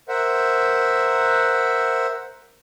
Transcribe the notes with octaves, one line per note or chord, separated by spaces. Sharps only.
A#4 C5 E5 F#5